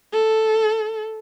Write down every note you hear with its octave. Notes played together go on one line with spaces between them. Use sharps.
A4